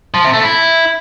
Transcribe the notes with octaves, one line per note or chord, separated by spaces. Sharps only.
F3
C3
A3
E4